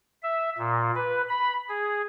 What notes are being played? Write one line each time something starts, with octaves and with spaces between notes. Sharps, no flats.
E5
A#2
B4
B5
G#4